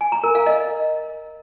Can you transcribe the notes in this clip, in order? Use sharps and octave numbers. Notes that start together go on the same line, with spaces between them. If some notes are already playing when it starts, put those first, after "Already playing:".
G#5
A#5
A#4
F5
D#5